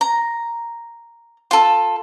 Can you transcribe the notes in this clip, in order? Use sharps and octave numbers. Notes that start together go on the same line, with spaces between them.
A#5
F4 A4